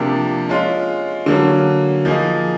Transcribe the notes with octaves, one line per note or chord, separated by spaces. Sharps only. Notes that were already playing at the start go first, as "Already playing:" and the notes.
Already playing: C3 F3 A#3 D4 G4
G#3 C#4 F4
D3 F#3 A#3 C#4
F3 A#3 D#4 G#4